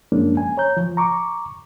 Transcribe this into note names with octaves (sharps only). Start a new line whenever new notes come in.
F#2 F3 G#3 A#3 C#4 D4
G#5
C#5 A#5 G6
F3
A#5 C#6 D6